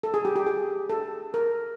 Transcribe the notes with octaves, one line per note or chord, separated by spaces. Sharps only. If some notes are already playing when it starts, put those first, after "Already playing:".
A4
G#4
G4
G4
G#4
A4
A#4